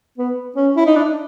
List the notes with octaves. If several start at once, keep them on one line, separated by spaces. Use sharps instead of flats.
B3
C#4
E4
D#4
D4